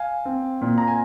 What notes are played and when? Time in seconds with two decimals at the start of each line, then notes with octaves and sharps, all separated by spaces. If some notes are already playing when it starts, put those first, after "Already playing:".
Already playing: F5 G#5
0.25 C4
0.61 A#2
0.78 A#5
0.88 G#5